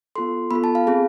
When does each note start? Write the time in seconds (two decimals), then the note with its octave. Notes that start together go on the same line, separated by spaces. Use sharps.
0.16 B3 F4 A4 C6
0.51 B3 F4 A4 B5
0.64 A5
0.75 F5
0.87 C4 G#4